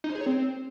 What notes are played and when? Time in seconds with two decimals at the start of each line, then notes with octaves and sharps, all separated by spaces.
0.04 D#4
0.10 C5
0.15 G#4
0.21 C#5
0.26 C4